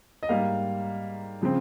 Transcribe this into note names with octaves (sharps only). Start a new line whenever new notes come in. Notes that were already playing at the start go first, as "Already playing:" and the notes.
D#5
G#2 G3 A#3 F5
C#3 F3 C4